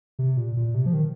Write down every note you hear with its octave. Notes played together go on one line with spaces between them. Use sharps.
C3
A#2
A#2
C3
F3
D#3